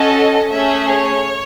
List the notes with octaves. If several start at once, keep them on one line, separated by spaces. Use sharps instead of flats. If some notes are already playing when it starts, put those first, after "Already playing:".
Already playing: C#4 F#4 A4 D#5
A3 C#4 G#4 E5
C#5